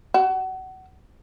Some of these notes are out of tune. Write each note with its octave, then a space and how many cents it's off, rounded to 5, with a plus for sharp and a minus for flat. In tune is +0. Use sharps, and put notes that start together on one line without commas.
F#4 +25